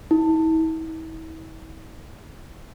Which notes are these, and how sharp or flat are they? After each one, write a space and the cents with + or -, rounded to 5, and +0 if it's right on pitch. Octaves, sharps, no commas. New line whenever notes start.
E4 -40